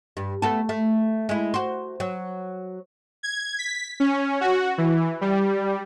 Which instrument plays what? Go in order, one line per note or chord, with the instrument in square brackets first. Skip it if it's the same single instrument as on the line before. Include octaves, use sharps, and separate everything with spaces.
[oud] G2
A3 B3 A4
A3
G#3 E4
F#4 C5
F#3
[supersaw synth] G#6
B6
C#4
F#4
E3
G3